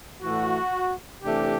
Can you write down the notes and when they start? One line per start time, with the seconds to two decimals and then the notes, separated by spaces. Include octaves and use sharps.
0.22 A2 E3 A3 F#4
1.23 C3 E3 A3 D4 G4